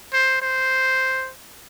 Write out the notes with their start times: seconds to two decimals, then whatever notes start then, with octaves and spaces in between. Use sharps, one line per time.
0.13 C5
0.42 C5